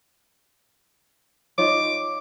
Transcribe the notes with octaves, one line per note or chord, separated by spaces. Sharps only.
D#4 F4 C#5 D6